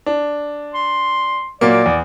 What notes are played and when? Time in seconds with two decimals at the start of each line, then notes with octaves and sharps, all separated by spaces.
0.06 D4
0.75 C6
1.61 A#2 F#3 A#3 D5
1.86 E2